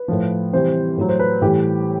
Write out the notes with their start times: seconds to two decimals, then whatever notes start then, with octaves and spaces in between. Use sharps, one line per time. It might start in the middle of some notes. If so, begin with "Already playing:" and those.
Already playing: B4
0.08 A2 F3
0.53 C3 E3 G3 C5
0.97 A2 F#3
1.08 C5
1.19 B4
1.42 A2 E3 G3 G4